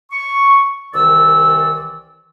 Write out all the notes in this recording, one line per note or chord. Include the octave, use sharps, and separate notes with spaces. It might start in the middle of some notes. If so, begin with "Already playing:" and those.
C#6
C2 D#3 E3 D5 E6